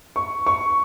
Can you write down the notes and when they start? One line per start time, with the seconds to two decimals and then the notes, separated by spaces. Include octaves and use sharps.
0.16 C#6
0.47 C#6